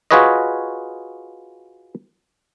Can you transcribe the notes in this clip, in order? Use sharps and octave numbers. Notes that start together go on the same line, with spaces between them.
F4 F#4 G#4 B4 C#5 D#5